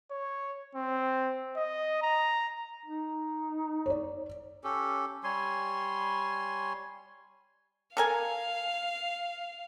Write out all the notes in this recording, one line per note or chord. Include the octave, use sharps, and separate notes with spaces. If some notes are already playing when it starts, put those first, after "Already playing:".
C#5
C4
D#5
A#5
D#4
C#5 D5
C#4 G4 A4
G3 C#5 G#5 C6
A4 A#4 F5 G#5